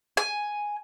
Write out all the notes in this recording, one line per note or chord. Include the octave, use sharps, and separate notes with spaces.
G#5